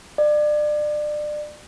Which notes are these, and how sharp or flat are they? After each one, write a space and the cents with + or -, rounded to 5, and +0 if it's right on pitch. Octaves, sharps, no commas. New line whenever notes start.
D5 +30